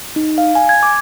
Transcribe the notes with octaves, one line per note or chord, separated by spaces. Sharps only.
D#4
F5
G#5
G#6
D6